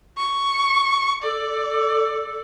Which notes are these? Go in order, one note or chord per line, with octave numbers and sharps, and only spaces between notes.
C#6
A4 D5